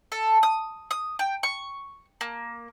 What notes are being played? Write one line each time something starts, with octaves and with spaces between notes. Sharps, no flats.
A4
D#6
D#6
G5
C#6
A#3